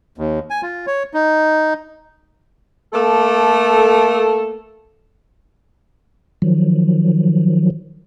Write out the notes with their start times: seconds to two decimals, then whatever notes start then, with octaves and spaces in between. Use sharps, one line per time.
0.18 D#2
0.50 G#5
0.63 F4
0.87 C#5
1.14 D#4
2.93 A3 A#3 A4
6.42 D#3 F3 F#3